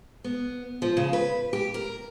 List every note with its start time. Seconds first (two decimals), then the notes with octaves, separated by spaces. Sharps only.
0.24 B3
0.82 F3
0.97 C#3
1.13 B4
1.53 G4
1.74 A#4